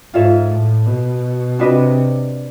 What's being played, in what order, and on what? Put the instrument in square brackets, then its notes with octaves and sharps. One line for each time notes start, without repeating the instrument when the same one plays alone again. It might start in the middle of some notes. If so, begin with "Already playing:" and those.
[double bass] G#2 [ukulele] F4 A4 C#5 E5
[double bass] A2
B2
[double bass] C3 [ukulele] D4 F#4 B4 D#5